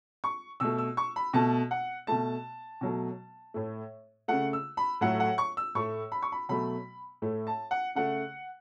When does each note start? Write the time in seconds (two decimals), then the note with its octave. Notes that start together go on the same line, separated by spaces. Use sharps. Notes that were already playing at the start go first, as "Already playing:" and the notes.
0.24 C#6
0.60 B2 A3 E6
0.78 E6
0.97 C#6
1.16 B5
1.33 B2 A3 A5
1.71 F#5
2.07 B2 A3 A5
2.81 B2 F#3 A3
3.54 A2 A3
4.28 C#3 A3 F#5
4.53 E6
4.77 B5
5.01 A2 F#3 A3 F#5
5.20 F#5
5.38 C#6
5.57 E6
5.75 A2 A3 C#6
6.12 B5
6.22 C#6
6.32 B5
6.49 B2 F#3 A3 B5
7.22 A2 A3
7.47 A5
7.71 F#5
7.95 C#3 A3 F#5